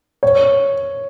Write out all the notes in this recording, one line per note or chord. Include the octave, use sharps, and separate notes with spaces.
C#5